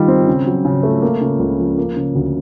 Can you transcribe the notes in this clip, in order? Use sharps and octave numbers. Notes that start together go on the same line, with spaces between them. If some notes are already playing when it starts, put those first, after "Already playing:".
Already playing: D#3 G3 F4
C4
C#3
F#3
C#3
A3
A#3
C#3
C#2
F3
A#3
C#3
D2